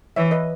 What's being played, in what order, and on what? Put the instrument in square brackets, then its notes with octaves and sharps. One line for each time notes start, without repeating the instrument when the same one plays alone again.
[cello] E3 [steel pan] C#5 E5
[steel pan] B4 D#5